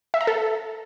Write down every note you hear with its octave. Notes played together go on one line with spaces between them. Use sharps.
E5
A#5
A4